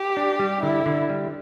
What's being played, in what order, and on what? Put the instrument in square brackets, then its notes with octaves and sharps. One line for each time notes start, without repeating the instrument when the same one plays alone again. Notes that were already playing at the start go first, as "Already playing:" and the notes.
Already playing: [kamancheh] G4
[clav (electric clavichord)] D4
G3
[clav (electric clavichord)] D3 [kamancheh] E4
[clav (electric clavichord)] D3
G3